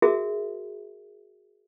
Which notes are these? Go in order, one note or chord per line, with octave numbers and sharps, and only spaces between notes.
F#4 G#4 A#4 E5